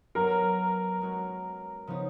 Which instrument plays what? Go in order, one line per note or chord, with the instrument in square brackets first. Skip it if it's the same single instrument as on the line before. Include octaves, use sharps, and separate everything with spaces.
[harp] F#3 B3 F4 [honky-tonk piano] A#4
[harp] G#3 C#4 F#4
C#3 F3 B3 D#4